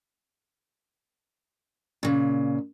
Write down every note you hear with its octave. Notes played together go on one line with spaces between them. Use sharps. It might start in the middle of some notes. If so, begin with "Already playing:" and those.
A#2 C#3